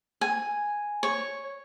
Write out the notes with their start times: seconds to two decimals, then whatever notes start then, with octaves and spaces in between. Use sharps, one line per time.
0.21 G#5
1.03 C#5